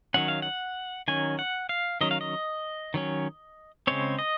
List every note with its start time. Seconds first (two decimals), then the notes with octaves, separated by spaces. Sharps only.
0.14 D#3 F#3 C#4 F#5
0.28 F5
0.42 F#5
1.08 D#3 F#3 C#4 G#5
1.39 F#5
1.69 F5
2.01 D#3 F#3 C#4 D#5
2.11 F5
2.21 D#5
2.94 D#3 F#3 C#4
3.87 C#3 G#3 C4 C#5
4.19 D#5